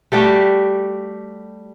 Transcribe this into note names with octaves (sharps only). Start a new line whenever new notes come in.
G3 A3 F#4 G4